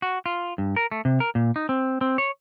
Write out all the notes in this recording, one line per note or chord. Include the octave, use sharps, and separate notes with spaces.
F#4
F4
G2
A#4
A3
C3
A#4
A#2
D#4
C4
C4
C#5